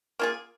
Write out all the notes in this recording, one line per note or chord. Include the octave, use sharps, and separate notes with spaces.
A#3 F4 G#4